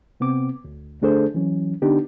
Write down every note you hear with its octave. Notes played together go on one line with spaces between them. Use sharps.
C3 B3 C4 D6
D2
D3 A3 D4 G#4 A4 C5
E3 F#3 C#4
D3 B3 D4 D#4 G4